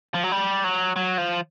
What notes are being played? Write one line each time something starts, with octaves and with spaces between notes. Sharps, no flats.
F3
F#3
G3
F#3
F#3
F3